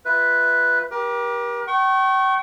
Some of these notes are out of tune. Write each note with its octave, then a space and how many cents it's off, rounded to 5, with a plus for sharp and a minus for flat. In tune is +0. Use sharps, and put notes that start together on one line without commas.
F4 +0 B4 +0 E5 +0
G4 +0 A#4 +40
G5 -40 C#6 -20